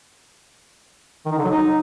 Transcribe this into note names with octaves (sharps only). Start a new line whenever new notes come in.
D#3
D#4
D3
F#3
D#4